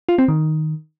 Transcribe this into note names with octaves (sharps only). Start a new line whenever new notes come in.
F4
C4
D#3